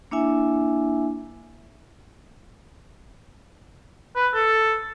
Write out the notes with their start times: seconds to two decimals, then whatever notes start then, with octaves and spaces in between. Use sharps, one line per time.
0.11 A#3 D4 E4 E5 G#5
4.15 B4
4.34 A4